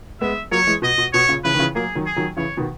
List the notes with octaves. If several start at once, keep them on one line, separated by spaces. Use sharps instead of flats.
G#3 B3 E5
F#3 A#3 C#5
E3 G#3
B2 D#5
B2
B2 C#5
A#2 C#3
C#3 E3 B4
D#3
C#3 E3
F#3 A#3 G#4
D#3 F#3
G#4
D#3 F#3
C#3 E3 C#5
B2 D#3